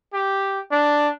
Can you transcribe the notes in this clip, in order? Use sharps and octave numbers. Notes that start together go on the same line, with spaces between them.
G4
D4